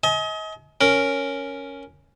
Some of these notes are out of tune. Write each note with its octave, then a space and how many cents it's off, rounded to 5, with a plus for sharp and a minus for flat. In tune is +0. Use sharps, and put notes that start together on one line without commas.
D#5 +35 G#5 +40
C#4 +0 A#4 +0